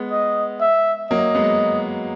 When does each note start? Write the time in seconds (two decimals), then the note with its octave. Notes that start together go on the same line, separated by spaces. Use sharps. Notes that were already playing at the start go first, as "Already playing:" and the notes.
Already playing: G#3 B3
0.11 D#5
0.61 E5
1.10 F#3 A#3 D#5
1.35 G#3 B3